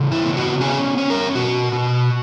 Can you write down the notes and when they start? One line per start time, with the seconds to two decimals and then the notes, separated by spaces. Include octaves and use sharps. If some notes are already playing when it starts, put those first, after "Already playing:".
Already playing: C#3 E3
0.12 E4
0.24 B3
0.37 F#4
0.61 C#4 G#4
0.98 C#4
1.10 A#4
1.35 B2 F#4
1.72 B2